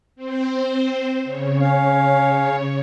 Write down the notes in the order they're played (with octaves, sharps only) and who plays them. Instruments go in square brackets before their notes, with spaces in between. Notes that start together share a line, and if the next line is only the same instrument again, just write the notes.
[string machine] C4 C5
C#3 C#5
[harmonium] C#4 F5